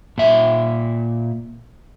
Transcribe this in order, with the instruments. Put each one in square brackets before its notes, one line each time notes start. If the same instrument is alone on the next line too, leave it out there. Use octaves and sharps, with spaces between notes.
[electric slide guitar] A#2 E5